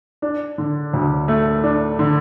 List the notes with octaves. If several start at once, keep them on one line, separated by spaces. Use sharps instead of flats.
D4
D3
D2
A3
D4
D3